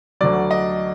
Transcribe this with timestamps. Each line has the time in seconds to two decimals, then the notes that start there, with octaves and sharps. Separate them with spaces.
0.21 D2 D3 F#3 D5
0.51 D#5